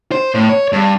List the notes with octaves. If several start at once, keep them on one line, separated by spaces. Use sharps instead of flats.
C5
A2
C#5
G2